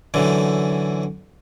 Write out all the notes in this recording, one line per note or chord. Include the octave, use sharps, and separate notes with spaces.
F#2 D3 E3